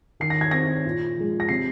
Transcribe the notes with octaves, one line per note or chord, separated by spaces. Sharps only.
D#3 C7
A#6
G#6
C4 A#6
A#2
F3 G#3
A#6
C3 C7